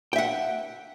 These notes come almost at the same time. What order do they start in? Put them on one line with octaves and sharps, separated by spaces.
G5 E5 F#5